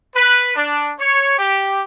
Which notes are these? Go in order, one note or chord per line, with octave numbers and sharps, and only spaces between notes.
B4
D4
C#5
G4